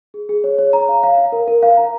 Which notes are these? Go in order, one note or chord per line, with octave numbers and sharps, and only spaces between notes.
G#4
G#4
C#5
C#5
A#5
F5
F5
F5
A#4
A#4
F5
A#5